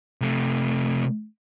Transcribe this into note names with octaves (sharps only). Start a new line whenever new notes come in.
C3 A3